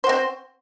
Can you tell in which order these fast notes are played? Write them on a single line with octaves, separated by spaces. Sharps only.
C5 F#4 C4